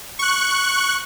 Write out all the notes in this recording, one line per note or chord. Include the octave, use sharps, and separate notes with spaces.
C#6 F#6